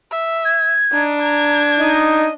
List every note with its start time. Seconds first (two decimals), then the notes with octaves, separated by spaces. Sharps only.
0.11 E5
0.45 G#6
0.93 D4 D#4
1.22 A#5 G#6
1.79 D#4 D#5